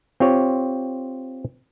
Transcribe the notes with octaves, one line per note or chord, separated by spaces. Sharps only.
C4 F4 G4 C#5